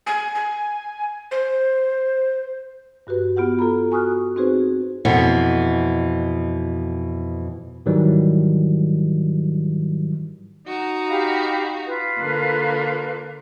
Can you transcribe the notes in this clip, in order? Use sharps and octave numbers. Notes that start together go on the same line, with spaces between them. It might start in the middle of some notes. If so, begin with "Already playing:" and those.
G#5
G#5
C5
G2 F#4 G4 B4
B3 F4 G4 F#5
F4 A4 A#5 B5
F#4 G#5 C#6 D#6 F6 F#6
C4 D#4 F#4 G#4 B4 C5
F2 B2 E3
G#2 D#3 E3 F#3 G3 D#4
D#4 F#4 A#5
G4 F5 B5
F4 B4
D3 A#3